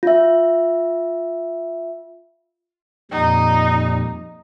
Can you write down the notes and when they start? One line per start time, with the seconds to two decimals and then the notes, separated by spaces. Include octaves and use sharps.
0.03 F4 E5
3.11 F2 A#2 G3 D#4